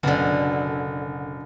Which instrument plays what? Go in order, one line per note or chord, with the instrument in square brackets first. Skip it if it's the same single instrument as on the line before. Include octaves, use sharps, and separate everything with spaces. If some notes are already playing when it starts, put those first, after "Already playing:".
[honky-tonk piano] F#1 [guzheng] B2 D3